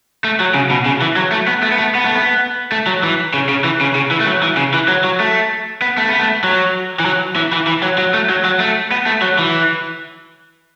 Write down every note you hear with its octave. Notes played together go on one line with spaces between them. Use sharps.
A3
F#3
C#3
B2
C#3
E3
F#3
A3
B3
A3
B3
A3
B3
A3
B3
A3
F#3
E3
C#3
C#3
E3
C#3
C#3
E3
A3
F#3
E3
C#3
E3
F#3
F#3
A3
B3
A3
B3
A3
F#3
E3
F#3
E3
E3
E3
F#3
F#3
A3
F#3
F#3
A3
B3
A3
F#3
E3